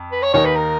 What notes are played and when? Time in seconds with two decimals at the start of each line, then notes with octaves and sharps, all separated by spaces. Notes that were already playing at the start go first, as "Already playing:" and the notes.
Already playing: F2
0.12 B4
0.23 C#5
0.34 D#2 D#3 A#3 D#4 C#5
0.45 B4
0.56 A#4